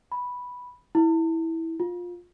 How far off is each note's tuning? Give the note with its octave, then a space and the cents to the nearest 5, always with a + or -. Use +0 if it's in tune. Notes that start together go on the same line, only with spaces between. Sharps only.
B5 -5
E4 -15
F4 +15